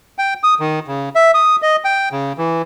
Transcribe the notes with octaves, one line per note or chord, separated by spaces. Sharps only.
G5
D#6
D#3
C#3
E5
D#6
D#5
G5
C#3
E3